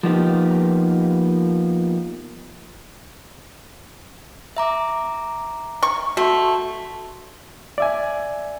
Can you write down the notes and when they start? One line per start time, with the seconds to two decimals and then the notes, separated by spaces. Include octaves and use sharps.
0.03 F3 A#3 B3 D#4 G4
4.57 E5 A#5 D6
5.83 C#6
6.17 A3 F#4 C6
7.78 D5 E5 G#5